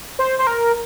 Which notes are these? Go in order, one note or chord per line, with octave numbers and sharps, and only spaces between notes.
C5
C5
A#4